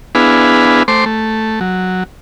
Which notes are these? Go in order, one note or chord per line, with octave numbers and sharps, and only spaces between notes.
B3 D4 E4 G#4 B4 F5
A3 C5 C6 D6
A3
F#3